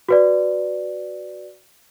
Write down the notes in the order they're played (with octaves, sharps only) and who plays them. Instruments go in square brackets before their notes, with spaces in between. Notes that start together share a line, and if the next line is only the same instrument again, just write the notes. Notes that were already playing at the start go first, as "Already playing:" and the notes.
[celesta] F#4 B4 D5